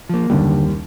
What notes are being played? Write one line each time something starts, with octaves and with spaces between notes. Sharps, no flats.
F3 A#3
F#1 D#2 D3 G3